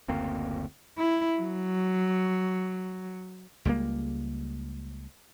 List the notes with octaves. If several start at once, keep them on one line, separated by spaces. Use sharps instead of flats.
F#1 D2 A#3 C4
E4
F#3
C#2 G3 G#3 A#3